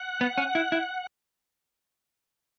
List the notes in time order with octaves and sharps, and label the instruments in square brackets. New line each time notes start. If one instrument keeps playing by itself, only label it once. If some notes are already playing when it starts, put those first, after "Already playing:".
Already playing: [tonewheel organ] F#5
[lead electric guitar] B3
C#4
E4
E4